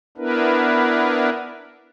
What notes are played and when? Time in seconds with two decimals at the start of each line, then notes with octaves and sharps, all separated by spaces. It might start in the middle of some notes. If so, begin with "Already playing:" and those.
0.18 B3 D4 E4 A#4 B4